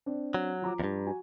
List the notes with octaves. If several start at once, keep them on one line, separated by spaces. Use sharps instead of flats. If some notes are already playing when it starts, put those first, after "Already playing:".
C4 D4
F#3
F3 A#5 D6
E2 G2
F#4 G#5